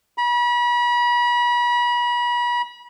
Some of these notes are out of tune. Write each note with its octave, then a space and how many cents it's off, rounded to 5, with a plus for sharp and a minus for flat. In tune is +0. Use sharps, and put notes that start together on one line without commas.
B5 -35